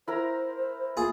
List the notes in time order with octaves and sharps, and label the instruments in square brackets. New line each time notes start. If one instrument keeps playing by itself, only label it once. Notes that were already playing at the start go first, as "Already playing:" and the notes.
[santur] E4 A#4 A#5 [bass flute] C5
[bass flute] A#3 [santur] F4 [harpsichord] G#4